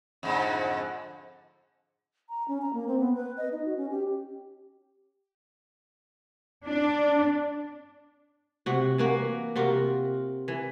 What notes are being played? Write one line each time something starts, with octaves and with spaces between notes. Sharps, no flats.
F2 G#2 D3
A#5
C#4
A#5
A#3
C4
B3
B4
D#5
D#4
F#4
C#4
G4
D4
C3 F#4
E3 A#3 F#4
C3 F4 F#4 A#4
E3